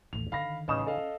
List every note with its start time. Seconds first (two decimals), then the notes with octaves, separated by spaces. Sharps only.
0.13 A1 D#2 F7
0.32 D3 D#3 F5 B5 A#6
0.68 A1 C#3 C#4 D#4 C#5 D#5 E7
0.87 A4 D#5 F5